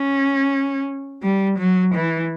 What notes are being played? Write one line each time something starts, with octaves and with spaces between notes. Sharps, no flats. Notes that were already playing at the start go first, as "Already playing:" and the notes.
Already playing: C#4
G3
F#3
E3